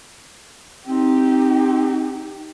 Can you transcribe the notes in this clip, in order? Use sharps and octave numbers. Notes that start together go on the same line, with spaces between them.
C4 D#4 G4